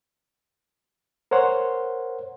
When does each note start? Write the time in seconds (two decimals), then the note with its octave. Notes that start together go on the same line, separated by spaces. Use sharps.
1.31 A#4 C5 C#5 F#5 C6